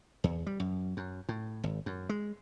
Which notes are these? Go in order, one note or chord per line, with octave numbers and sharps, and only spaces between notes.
E2
G3
F#2
F#2
A2
G#1
F#2
G#3